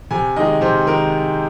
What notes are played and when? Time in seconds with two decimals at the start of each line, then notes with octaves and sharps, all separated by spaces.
0.11 C3 G#5
0.36 D#3 G#3 D#5
0.61 C3 C5
0.86 D#3 G#3 A#4